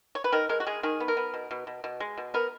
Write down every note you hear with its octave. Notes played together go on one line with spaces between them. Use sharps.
C#5
B4
D#3 A#4
G#3 A#4
F#4
G#3 G#4
D#3 G#4
B3
A#4
B3
B2
B2
B2
B2
G#3
B2
B3 A#4